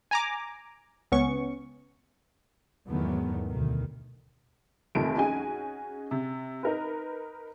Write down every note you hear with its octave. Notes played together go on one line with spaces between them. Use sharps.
G#5 A#5 D6
C#2 B3 C#4 C#6
E2 G#2 D#3 F#3 A3 B3
D2 B2 D#3
F1 A#1 F2 D#3 F3 D7
C#4 D#4 F#4 G#4 G#5
C3
D#4 A#4 B4